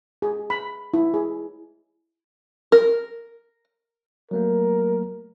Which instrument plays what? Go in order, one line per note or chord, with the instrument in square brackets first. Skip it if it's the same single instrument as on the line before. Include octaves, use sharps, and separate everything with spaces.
[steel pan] G#4
B5
E4
G#4
[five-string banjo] A#4
[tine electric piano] F#3 A3 A#3 [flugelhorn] A#4